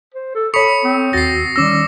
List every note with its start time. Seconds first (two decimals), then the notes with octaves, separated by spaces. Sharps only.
0.14 C5
0.35 A4
0.54 A4 C#5 B5 C#6 D#6 C#7
0.84 C4
1.13 D#2 F#4 A6 A#6 C7
1.56 D#3 G3 C#4 D6 E6 A#6